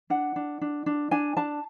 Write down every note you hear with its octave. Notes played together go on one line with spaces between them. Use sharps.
D4 F#5
D4
D4
D4
D4 G#5
D4 A5